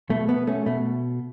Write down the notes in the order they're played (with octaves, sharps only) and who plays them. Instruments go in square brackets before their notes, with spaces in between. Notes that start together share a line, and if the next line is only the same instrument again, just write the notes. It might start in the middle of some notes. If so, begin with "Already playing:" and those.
[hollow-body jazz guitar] B2 A3
B3
A3 C#4
B2 A3